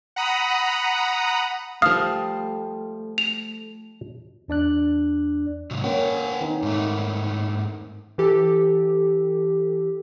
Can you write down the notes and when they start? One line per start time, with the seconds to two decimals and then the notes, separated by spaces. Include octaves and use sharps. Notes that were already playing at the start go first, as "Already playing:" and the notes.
0.16 F#5 A#5 B5 D#6
1.82 F3 G3 A3 F5 D#6
3.18 F7
4.48 E2 D4 D5 F#6
5.71 G#2 C3 F#3
5.84 A#3 C#4 B4 F#5 G5
6.41 D#3 C4 D#4
6.62 G#2 A3
8.18 E3 G4 A4